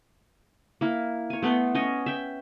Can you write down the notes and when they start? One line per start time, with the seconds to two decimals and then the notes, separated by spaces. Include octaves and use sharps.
0.81 A#3 E4
1.30 C#5 G#5
1.42 A3 B3 A4 C6
1.75 C#4 C#5 D#5 G#5
2.06 E5 G5